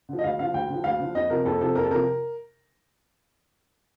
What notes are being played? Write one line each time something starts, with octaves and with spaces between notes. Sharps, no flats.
D3 F3
D#5
D2 F5
D3 F3 F5
D2 G5
D3 F3
D2 F5
D3 F3
F2 D#5
C3 F3 A#4
F2 A4
C3 F3 A4
F2 A#4
A4
C3 F3 A#4